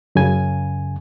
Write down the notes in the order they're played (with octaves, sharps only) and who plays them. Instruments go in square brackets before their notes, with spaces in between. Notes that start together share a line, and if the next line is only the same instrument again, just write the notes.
[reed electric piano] F#2 C#3 G#5